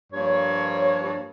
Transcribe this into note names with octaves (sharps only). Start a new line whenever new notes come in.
G2 F3 A#3 C#5